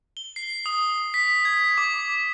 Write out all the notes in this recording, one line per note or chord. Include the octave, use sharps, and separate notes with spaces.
G7
C7
D#6
B6
G#6
D6